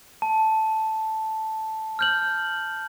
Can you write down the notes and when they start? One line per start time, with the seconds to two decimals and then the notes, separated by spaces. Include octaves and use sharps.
0.22 A5
1.99 F6 G6 F#7